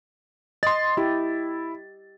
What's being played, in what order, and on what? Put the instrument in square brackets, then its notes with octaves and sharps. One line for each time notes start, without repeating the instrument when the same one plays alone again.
[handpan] D#5 [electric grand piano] C6 A6
[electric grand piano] E4 [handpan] G4